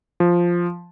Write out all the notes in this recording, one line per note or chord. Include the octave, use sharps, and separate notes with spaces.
F3